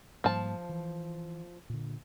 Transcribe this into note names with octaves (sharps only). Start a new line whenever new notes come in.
G#2 F3 G3 A#3 A5
E3
A#2 D3